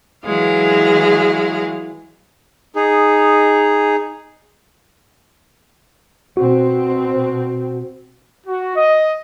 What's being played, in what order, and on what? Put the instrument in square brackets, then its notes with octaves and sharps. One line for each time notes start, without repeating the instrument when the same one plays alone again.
[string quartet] E3 F#3 G#3 G#4 F5
[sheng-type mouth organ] D#4 G#4
[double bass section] B2 C4 [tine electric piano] F#4
[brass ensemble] F#4
D#5